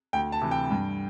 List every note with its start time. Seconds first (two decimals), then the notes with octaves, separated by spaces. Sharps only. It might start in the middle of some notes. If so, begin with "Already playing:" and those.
0.13 D2 G5
0.32 A5
0.42 C3 E3
0.51 G5
0.71 G2